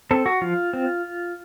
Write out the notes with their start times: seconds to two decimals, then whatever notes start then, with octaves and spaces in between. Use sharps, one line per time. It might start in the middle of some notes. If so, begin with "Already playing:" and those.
0.11 C4 A4
0.26 F#4
0.41 F3 F4
0.73 C4